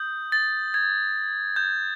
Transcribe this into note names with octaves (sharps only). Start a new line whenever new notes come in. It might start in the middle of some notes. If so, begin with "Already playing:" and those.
Already playing: D#6 G6
A6
G#6
G6